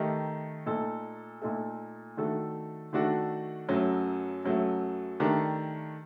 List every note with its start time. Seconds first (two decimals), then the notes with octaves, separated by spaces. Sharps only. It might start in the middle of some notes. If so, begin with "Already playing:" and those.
Already playing: D#3 A3 D#4 G4 A#4
0.66 A#2 A3 D#4 A4
1.42 A#2 A3 D#4 A4
2.17 D#3 A3 D4 F#4 A4
2.93 D#3 A3 D4 F#4 A4
3.69 F#2 F#3 A3
4.45 F#2 F#3 A3
5.20 D#3 A3 D4 G4 A#4